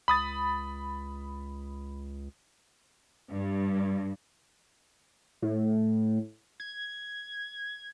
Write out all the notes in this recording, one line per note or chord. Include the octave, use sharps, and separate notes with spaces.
C#2 B5 D#6 A6
G2
A2
G#6